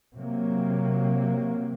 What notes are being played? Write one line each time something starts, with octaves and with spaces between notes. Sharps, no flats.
C3 F#3 A#3